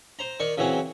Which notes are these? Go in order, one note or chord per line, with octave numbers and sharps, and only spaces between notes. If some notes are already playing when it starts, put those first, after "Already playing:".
C5 A#5
D#3 D5 C#6
C#3 E3 F#3 C4